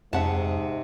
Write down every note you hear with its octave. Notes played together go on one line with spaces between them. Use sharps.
F2 G#2 C3 E5 F#5 A5